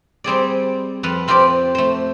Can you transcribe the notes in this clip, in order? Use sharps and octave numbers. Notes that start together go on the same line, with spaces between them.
G3 C4 G#4 D5
F2 A4 B4 F5
C4 F4 G4 C5 D5
A3 C5